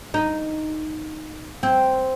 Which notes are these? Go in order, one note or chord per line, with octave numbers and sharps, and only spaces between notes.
D#4
C4